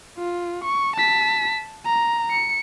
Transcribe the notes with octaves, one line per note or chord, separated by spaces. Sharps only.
F4
C#6
A5 B6
A#5
C#7